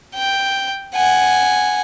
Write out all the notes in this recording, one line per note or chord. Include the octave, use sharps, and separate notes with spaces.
G5
F#5 G#5